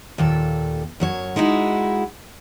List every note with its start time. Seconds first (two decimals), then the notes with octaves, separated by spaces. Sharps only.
0.18 D#2 A#2 A4
1.00 F#2 F#3 C#5
1.36 G#3 D#4 E4 F#4